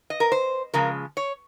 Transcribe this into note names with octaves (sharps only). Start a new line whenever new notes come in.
D#5
A#4
C5
C#3 F3 G#3 A#4
C#5